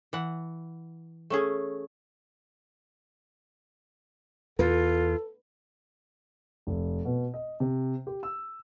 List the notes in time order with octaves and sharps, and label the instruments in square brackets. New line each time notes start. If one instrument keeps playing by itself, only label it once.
[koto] E3 F#5
A3 C#4 G#4
[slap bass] E2 [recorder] F4 [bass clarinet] A4 [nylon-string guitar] B4
[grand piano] F1
B2
D#5
C3
G4
E6